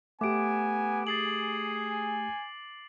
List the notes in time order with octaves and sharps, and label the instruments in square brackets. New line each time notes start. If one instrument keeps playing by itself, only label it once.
[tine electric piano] A3 G4 [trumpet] B3 [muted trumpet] G#5 [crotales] D6 D7
[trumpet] G#4 [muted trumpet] G#5 [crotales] A6 C7 F#7